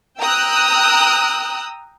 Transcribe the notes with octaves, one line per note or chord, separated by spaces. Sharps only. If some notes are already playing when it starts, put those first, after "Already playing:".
G5 A#5 D#6 E6 F#6